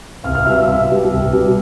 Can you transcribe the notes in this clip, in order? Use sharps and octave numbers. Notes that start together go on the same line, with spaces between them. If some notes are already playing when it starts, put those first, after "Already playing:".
C2 F5 F6
F5 F6
B2 G3 E5 E6
E5 E6
C2 E5 E6
B2 G3
C2
B2 G3